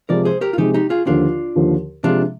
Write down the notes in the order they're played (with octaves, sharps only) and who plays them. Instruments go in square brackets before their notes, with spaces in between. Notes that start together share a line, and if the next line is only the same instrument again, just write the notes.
[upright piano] C3 F3 G#3 [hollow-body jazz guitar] A#4 D5
[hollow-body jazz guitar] G#4 C5
G4 A#4
F4
[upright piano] C3 F3 G#3 [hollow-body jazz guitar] D#4 G4
[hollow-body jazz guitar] D#4 G4
F4 G#4
[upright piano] D#2 D3 F3 [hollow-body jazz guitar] D4 F4
[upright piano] D#2 D3 F3
[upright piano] C3 F3 G#3 [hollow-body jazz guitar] D4 F4